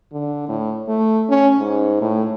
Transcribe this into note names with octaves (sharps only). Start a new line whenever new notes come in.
D3
A2
A3
C#4
G#2
A2